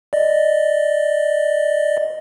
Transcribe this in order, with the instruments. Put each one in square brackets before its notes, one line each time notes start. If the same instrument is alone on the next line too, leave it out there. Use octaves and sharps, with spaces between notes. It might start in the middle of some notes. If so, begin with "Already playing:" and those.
[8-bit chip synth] D5 D#5